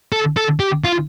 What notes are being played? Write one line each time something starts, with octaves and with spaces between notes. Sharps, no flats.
A4
A4
G4
F4